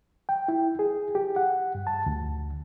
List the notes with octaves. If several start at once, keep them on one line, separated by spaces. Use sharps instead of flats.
G5
E4
G#4
G4
F#5
G2
A5
D2